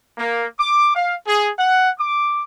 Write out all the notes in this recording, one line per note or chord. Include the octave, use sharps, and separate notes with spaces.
A#3
D6
F5
G#4
F#5
D6